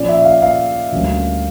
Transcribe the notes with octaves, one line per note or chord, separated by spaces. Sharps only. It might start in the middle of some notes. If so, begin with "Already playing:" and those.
Already playing: A#2 F3 C#4 D5
E5
F5
F5
D2 D3 G3 A#3 C#4